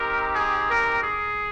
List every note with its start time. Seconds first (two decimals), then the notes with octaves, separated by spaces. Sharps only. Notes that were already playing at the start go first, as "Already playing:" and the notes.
Already playing: C4 D#4 G4 A#4
0.34 G#4
0.68 A#4
1.02 G#4